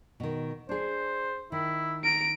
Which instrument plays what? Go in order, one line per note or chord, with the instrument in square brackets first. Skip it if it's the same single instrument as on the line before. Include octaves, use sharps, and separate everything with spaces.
[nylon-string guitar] B2 D#3
[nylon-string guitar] D4 G#4 [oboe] C5
[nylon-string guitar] D#3 [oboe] E4
[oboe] A#5 [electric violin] D7